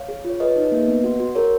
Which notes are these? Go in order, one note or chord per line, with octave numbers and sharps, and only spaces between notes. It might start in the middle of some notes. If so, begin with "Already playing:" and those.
Already playing: C#5 F5
G#4
F4 C#5
G#4 B4 D#5
D#4
A#3
B3
F#4
F#4
G#4 A#4 C#5